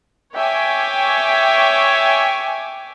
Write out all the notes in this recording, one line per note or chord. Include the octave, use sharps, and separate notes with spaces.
C#5 E5 G5 G#5 D6